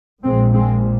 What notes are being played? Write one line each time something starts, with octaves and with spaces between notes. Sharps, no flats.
A#1 A#2 G#3 C4
G#3 C4